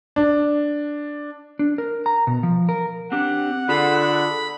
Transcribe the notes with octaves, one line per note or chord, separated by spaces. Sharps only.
D4
D4
A#4
A#5
B2
F3
A#4
C4 D4 G4 F#5
D3 F4 G#4 A4 B5